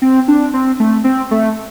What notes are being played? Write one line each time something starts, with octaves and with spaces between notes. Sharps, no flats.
C4
D4
C4
A3
C4
A3